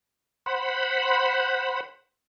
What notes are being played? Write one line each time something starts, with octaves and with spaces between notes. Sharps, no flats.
C5 F#5 B5